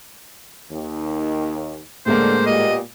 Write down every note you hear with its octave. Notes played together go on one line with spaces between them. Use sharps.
D#2 D#3
A2 D3 G#3 A#3 C5
A#2 B3 G4 D#5